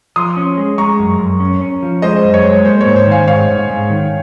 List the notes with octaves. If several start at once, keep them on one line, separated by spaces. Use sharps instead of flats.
F3 C6 D#6
C#4
G#3
G#3 A#5 C#6
F#2
F#2
C#4
C#4
F3
G#3 C5 D#5
F#2
C#5
G#3
A#3 C5
G#2 C#5
C5
D#3
F5 G#5
G#2 C#5 F5
G#2
G#2
D#3